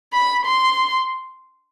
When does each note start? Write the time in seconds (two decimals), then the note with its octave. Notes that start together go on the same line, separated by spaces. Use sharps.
0.13 B5
0.46 C6